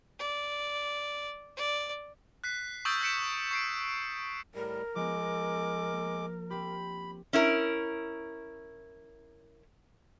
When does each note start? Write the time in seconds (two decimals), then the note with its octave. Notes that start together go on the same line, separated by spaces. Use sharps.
0.19 D5
1.57 D5
2.44 F#6 B6 C7
2.85 C#6 D#6 E6 G6 A6 D7
3.01 F#6 G6 B6 C#7 D7 E7
3.51 C#6 C7 D7
4.55 A2 G3 A#4
4.95 F3 G#3 B3 D6
5.91 A#3
6.50 C4 G4 B5
7.33 C#4 E4 A#4